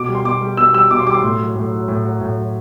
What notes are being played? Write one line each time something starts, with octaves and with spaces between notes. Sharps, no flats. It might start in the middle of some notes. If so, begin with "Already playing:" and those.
Already playing: B2 D6
G3
C6
B2 D6
G3
B2 E6
G3 E6
B2 D6
C6
G3 D6
C6
A2
F#3
A2
F#3
A2
F#3
A2
F#3